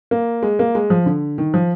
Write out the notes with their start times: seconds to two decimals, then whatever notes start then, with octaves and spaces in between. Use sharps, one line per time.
0.11 A#3
0.43 G#3
0.59 A#3
0.75 G#3
0.90 F3
1.06 D3
1.38 D#3
1.54 F3